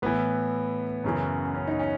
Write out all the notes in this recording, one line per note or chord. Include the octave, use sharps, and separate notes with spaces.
A2 E3 B3
F#2 C#3 E3
C#4
D#4
C#4